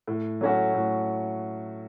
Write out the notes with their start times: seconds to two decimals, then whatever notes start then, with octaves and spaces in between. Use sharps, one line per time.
0.08 A2
0.41 F#3 A3 C#4 F#4
0.74 A2